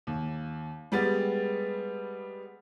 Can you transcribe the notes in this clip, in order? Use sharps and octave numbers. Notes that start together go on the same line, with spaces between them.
D#2
G3 G#3 B3 A6